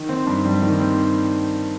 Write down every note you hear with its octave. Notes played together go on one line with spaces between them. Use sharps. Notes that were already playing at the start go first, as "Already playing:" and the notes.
Already playing: D#3
C4
G2
G3
D#3
C4